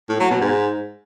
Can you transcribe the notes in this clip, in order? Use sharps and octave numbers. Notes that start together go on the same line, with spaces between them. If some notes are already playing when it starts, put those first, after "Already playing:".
A2
F#3
B2
G#2